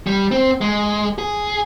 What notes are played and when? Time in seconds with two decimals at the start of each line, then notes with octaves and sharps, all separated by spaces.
0.07 G3
0.31 C4
0.61 G#3
1.18 G#4